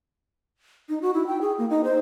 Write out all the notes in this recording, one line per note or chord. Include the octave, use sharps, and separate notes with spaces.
D#4
F#4
E4
G5
G#4
A#3
D#4
C5